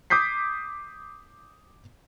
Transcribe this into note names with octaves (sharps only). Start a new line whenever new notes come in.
D6 D#6 G6 B6 C7